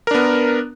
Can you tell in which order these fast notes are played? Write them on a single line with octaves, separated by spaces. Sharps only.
A#4 D4 B3